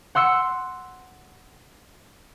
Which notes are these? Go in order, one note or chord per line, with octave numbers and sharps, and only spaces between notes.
F#5 C6 E6 C#7